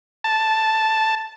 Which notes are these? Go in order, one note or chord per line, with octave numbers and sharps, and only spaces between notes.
A5